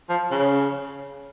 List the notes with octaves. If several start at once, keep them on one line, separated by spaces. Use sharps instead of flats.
F3
C#3